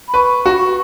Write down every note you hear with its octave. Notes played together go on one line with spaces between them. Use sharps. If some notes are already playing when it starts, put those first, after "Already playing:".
B5
B4 C#6
F#4